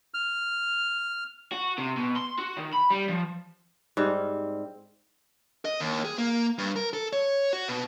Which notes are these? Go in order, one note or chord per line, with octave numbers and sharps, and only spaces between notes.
F6
F#4
C3
B2
C6
F#4
D#3
B5
G3
F3
G#2 G3 C4
D#5
D#2
G#4
A#3
G2
A#4
A4
C#5
F#4
B2